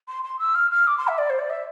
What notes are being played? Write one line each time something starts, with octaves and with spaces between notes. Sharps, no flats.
C6
C6
E6
F6
F6
D6
C6
E5
D5
C5
D5
E5